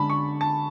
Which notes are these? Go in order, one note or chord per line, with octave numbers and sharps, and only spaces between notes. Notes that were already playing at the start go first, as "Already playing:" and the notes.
Already playing: D3 G#3 C#4 A5 B5
C#6
A5